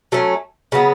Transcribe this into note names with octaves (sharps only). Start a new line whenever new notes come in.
F#3 A3 C#4
C#3 F#3 B3